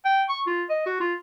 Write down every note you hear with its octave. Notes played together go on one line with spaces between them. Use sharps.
G5
C#6
F4
D#5
F#4
F4